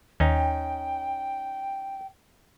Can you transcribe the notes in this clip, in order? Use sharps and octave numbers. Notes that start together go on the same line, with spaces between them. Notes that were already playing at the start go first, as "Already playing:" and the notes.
D#2 C#4 D#4 G5